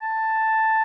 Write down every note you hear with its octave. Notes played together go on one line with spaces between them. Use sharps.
A5